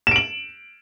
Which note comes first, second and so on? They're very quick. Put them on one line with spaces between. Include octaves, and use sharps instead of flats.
E7 D7 F#7